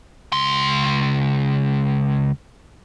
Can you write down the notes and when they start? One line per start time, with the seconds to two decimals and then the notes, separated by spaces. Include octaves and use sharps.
0.33 C#2 C6